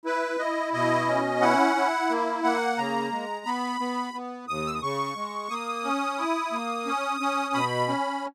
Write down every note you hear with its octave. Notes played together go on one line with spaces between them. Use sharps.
E4 B4
E4 D#5
B2 D#5
C#4
E4 F#5
E4
A#3
A#3 F#5
C#3 A#5
G#3
B3 B5
B3
B3
D#2 D#6
E6
D#6
C#3 C#6
G#3
A#3 D#6
C#4
E4
A#3
C#4
C#4
B2 B5
C#4